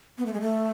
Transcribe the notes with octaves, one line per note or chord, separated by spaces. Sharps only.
B3
A3
G#3
A3